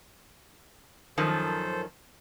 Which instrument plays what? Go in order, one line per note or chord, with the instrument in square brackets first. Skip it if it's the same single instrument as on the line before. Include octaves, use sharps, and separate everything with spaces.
[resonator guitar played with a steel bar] F#2 D#3 F3 [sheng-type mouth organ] A4 C5